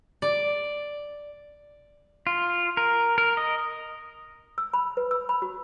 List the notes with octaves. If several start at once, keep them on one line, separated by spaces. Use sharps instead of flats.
D5
F4
A#4
A#4
D#5
E6
B5
B4
E6
B5
F#4